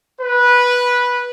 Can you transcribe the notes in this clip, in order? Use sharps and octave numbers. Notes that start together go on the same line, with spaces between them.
B4